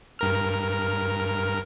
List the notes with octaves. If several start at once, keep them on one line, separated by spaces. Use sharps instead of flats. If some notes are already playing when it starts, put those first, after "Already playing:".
G2 A#4 F6